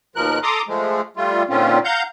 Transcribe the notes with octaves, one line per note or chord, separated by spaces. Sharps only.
D#2 B2 F3 A#4 F#6
A4 A#5 C6 D6 D#6
F3 G#3 A3
G3 A3 F4
A#2 D3 D#3 C4 C#4 F4
F5 F#5 A#5 G6